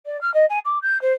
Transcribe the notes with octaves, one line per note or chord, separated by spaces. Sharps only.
D5
F6
D#5
G#5
D6
G6
C5